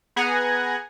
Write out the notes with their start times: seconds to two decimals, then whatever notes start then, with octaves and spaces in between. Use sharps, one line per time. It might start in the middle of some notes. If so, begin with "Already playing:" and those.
0.16 B3 G#4 F#5 G#5 A#5